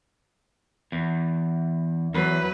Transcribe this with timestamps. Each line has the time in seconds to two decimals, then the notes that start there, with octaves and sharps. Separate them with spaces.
0.92 E2
2.14 E2 F#3 B4